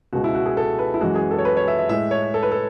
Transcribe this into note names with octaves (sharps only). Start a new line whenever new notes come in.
C#2 B2 G#3 F#4
E4
F#4
G#4
A4
B4
E4
F#2 E3 G#3 F#4
G#4
A4
C#5
B4
C#5
E5
E5
A2 G#3 E5
C#5
A4
B4
A4